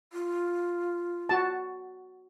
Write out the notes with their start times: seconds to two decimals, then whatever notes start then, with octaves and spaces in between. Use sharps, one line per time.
0.13 F4
1.29 F#4 A5